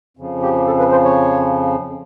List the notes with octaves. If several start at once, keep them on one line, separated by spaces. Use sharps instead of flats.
F2 C#3 F3
G4
A4
B4
C5
C#5